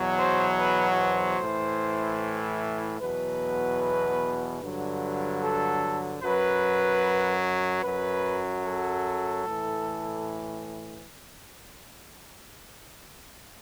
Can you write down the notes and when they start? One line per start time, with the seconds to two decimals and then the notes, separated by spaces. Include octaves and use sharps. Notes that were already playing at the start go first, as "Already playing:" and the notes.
Already playing: E2 B2 F#3
0.19 C5
0.59 B4
0.99 C5
1.40 A2 E3
3.00 E2 B2 F#3 B4
4.61 G2 D3 F#3
5.42 A4
6.22 F#2 F#3 B4
7.83 F#2 F#3 B4
8.63 A4
9.43 A2 E3